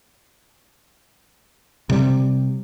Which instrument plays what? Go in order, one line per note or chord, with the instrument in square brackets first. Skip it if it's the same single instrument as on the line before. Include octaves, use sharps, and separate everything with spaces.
[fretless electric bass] C3 G3